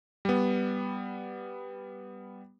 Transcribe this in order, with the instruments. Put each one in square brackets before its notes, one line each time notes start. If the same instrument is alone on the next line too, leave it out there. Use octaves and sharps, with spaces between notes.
[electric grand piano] G3 B3